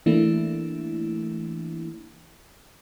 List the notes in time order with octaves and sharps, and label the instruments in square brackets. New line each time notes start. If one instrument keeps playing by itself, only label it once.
[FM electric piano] E3 A3 A#3 D4 E4